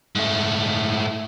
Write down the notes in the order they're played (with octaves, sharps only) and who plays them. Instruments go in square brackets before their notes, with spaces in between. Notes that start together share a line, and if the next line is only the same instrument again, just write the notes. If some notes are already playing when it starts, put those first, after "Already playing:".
[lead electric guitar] G#2 A3